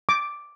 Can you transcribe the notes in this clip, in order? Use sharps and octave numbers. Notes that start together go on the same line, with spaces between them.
D6